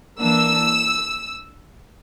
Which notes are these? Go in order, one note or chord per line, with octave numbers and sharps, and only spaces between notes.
E3 A#3 D4 E6